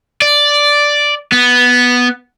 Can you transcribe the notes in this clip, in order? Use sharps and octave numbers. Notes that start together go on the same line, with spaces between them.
D5
B3